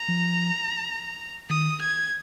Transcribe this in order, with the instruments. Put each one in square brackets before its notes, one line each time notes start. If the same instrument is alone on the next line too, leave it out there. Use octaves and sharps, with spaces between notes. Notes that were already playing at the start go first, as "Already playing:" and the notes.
Already playing: [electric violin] A#5
[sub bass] F3
[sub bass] D#3 [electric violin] D#6
[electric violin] G#6